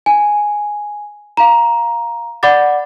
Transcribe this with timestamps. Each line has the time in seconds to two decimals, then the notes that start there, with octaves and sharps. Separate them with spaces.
0.06 G#5
1.37 F5 A#5
2.43 D5 F#5 B5 D6 A6